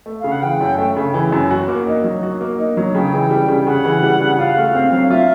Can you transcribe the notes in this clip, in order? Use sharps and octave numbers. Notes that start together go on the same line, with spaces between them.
A3
C#3 F5
F#5
E3 G5
F#2
A3
C#3
E3
F#2
F#4
A#3
D#4
F#3
F#4
A#3
D#4
F#3
C#3 G5
E3
G3
C#3
C#3 F#5
E3
G3
C#3
F4 F5
A3
C4
F#3
F4 E5